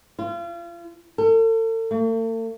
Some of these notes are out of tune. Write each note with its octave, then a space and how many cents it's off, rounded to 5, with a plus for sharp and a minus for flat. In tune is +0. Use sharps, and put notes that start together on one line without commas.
F4 -35
A4 +40
A3 +45